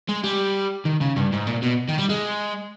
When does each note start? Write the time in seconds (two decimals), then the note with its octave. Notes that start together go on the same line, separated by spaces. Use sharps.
0.09 G#3
0.24 G3
0.85 D#3
1.01 C#3
1.16 G2
1.32 G#2
1.47 A#2
1.62 B2
1.88 D#3
1.98 G3
2.09 G#3